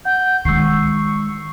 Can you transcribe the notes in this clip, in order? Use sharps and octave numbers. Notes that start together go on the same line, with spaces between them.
F#5 G6
D#3 G#3 C#6 E6 C7